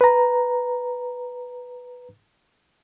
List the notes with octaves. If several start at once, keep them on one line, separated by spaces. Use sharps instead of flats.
B4 A#5